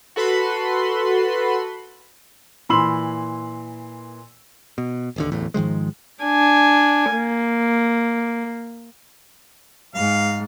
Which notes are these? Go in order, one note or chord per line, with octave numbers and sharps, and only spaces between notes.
F#4 A4 B4 B5 C6
A#2 E3 B5 C6 E6 F#7
B2
D1 D#2 D3
D1 A1 E2 A2
G#2 D#3 F3 G#3
D4 G#5
A#3
G#2 F5